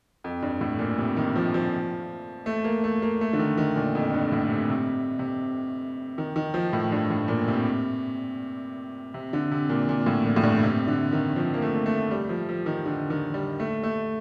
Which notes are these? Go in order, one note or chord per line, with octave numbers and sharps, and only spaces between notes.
F2
G2
A2
A#2
C3
D#3
F3
F3
A3
A#3
A3
A#3
A3
D3
D#3
D#3
A#2
F2
G2
A2
C3
C3
C3
D#3
D#3
F3
A2
G2
A2
A#2
C3
C3
D3
C3
A#2
A#2
A2
A#2
A2
G2
C3
D3
D#3
F3
A#3
A3
A3
G3
F3
F3
D#3
D3
D#3
G3
A3
A3